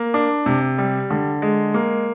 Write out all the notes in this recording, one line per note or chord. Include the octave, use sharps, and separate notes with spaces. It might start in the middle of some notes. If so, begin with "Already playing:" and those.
Already playing: A#3
D4
C3
G3
D3
G#3
A#3